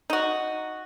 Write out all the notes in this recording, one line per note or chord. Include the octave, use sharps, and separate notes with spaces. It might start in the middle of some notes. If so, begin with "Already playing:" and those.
D#4 F#4